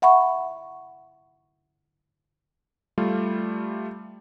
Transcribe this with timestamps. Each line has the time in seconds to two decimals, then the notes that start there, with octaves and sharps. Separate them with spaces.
0.02 E5 F#5 B5 C#6
2.98 G3 A3 F4